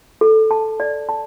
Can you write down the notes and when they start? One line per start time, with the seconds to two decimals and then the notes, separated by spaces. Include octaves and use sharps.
0.21 A4
0.51 A5
0.80 D5
1.09 A5